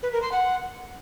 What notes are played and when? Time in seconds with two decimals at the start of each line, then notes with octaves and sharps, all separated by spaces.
0.03 B4
0.12 A#4
0.22 C6
0.32 F#5